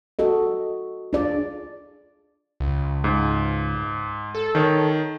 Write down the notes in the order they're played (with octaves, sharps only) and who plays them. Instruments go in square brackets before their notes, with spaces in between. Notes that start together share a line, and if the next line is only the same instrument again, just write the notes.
[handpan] F#4 A4 D#5
D4 F4 G#4 D5
[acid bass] C#2
[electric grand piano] G#2
[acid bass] A4
[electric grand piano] D#3 C#5